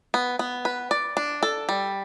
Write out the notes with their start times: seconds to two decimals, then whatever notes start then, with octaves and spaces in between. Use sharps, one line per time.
0.14 B3
0.39 B3
0.65 B4
0.91 D5
1.17 D4
1.43 A4
1.69 G3